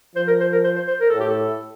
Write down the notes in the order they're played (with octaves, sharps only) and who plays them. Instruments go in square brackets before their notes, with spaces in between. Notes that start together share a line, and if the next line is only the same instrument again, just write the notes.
[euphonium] F3 [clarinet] C5
[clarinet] A#4
C5
A#4
C5
C5
C5
A#4
[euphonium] A2 [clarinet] A4
[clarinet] G4
A4